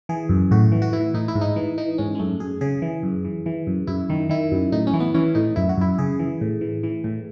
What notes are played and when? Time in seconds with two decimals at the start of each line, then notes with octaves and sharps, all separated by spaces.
0.09 E3 G#4
0.29 F#2
0.51 A2 F#4
0.72 E3
0.82 F#4
0.93 E3 E4
1.14 A2 D#4
1.28 E4
1.35 G#2
1.41 D#4
1.56 E3
1.78 E3 D#4
1.98 G#2 C#4
2.15 G#3
2.19 F#2 A3
2.40 F#2 G#4
2.61 C#3 G#4
2.82 E3
3.03 F#2
3.25 E3
3.46 E3
3.67 F#2
3.87 F#2 E4
4.10 D#3
4.29 D#3 E4
4.52 F#2
4.72 A2 D#4
4.87 C#4
4.94 E3
5.00 B3
5.14 E3 C#4
5.35 A2 D#4
5.56 F#2 E4
5.69 F#4
5.77 F#2 E4
5.98 C#3 G#4
6.19 E3
6.41 A2
6.61 E3
6.83 E3
7.04 A2